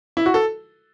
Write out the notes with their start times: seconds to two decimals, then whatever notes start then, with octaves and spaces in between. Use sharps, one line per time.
0.17 E4
0.26 F#4
0.34 A4